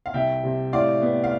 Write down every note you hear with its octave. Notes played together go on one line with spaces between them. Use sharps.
F5
C2 E5 G5
C3
A2 D5 F5
B3
F5